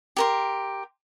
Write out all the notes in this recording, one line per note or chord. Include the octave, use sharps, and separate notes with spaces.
G4 A#4 C6